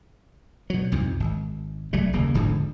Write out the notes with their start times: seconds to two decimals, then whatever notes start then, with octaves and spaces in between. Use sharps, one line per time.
0.70 B2 F#3
0.92 C2 F2 G#2
1.20 G#1
1.93 C2 F#3 G3 A3
2.13 D#1 C#3 A#3
2.34 E1 G#2 D3 F3